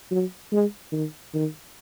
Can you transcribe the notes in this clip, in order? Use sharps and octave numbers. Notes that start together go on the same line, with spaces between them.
F#3
G#3
D#3
D#3